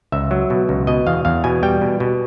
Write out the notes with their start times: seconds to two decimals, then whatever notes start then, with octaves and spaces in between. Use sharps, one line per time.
0.12 C#2 E5
0.31 F#3
0.50 B2
0.69 C#2
0.87 B2 D#5
1.06 E2 F5
1.25 E2 F5
1.44 B2 G#5
1.63 G3 G5
1.81 B2
2.00 B2